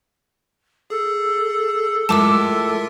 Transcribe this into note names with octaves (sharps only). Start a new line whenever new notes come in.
G#4 A4
A2 G#3 F4 A#4 E5 A5 D6 E6